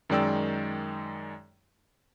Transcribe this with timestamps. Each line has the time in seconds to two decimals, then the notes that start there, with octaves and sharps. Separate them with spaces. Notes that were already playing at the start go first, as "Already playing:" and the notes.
0.10 F#2 D#3 G#3 D5 G5 E6